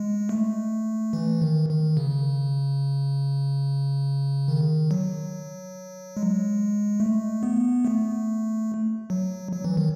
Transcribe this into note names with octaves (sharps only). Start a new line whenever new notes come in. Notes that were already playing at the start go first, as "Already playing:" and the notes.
Already playing: G#3
A3
E3
D#3
D#3
C#3
D#3
F#3
G#3
A3
B3
A3
F#3
F#3
E3
D#3